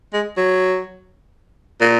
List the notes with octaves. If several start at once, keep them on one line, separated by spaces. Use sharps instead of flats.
G#3
F#3
A#2